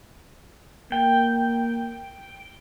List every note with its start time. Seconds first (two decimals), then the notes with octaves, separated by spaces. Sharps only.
0.92 A#3 G5